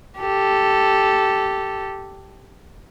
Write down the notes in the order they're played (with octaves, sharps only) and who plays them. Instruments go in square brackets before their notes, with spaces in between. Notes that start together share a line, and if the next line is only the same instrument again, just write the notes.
[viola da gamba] G4 A4